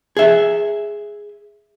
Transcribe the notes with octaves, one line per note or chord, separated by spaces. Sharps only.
G#4 E5